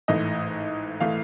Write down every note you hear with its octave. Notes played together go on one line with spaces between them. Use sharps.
A1 G#2 E3 A3 D#5
E3 A3 F5